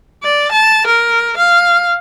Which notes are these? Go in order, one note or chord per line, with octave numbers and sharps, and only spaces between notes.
D5
A5
A#4
F5